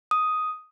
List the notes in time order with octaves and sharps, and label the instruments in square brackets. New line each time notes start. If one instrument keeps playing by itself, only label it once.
[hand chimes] D#6